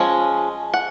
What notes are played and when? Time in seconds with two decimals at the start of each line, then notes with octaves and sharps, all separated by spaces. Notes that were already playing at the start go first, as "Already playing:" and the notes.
Already playing: F3 G#3 C#4
0.74 F#5